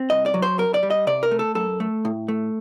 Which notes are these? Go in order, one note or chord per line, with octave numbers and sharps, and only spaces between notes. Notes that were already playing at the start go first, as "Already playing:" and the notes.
Already playing: C4
C2 D#5
D5
F#3
C5
F#2 A#4
D5
G3
D#5
C3 D5
A#4
A3
A4
F#2 A4
A3
A2
A3